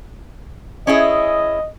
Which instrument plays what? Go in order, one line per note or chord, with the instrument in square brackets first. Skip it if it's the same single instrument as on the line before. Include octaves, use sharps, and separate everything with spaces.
[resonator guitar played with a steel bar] C#4 E4 G#4 [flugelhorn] D#5